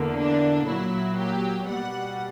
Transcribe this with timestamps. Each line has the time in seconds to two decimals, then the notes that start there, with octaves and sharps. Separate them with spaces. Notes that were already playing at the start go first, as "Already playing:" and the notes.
Already playing: E2 D3 A#3
0.18 D4
0.68 A#2 F#3 A#3 E4
1.18 G4
1.69 B2 G3 A#3 F#5